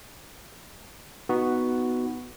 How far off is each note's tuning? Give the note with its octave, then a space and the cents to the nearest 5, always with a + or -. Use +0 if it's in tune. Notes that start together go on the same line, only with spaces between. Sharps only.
B3 +0 D#4 +0 F#4 +0